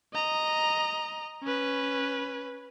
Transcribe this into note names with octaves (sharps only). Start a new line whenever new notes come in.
D#5 A#5
C#4 B4